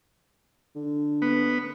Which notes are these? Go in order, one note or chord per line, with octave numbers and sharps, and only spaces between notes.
D3
B3